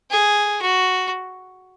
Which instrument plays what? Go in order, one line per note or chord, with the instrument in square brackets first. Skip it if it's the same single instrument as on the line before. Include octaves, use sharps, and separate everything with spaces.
[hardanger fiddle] G#4
F#4